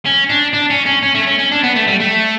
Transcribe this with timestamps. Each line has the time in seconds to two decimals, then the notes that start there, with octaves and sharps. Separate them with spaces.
0.05 C#4
0.29 D4
0.53 D4
0.70 C#4
0.86 C#4
1.03 C#4
1.15 A3
1.27 C#4
1.39 C#4
1.52 D4
1.64 B3
1.76 A3
1.88 G3
2.00 A3